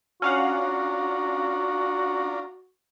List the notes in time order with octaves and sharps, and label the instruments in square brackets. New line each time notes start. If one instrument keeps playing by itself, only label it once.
[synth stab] C#4 F5 F#5 [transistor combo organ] D4 F4 A#5 [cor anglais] F#4